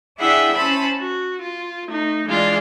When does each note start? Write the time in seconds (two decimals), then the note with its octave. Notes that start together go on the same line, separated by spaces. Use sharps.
0.19 D4 E4 G#4 E5 F#5 G5
0.55 C#4 C5 A5 B5
0.98 F#4
1.40 F4
1.86 A3 D#4
2.27 E3 G#3 D4 F4 D5